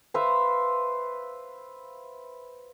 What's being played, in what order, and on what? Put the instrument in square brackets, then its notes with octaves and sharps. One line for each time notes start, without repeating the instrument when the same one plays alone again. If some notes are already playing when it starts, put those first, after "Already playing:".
[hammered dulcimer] B4 C5 E5 F5